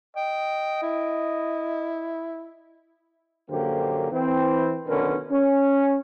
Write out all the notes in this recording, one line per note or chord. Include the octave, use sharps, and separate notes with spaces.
D#5 G5
E4
A#1 F#2 D3 A#3 G4 C5
E3 C4
B1 D3 D#3 C#4 A#4 B4
C#4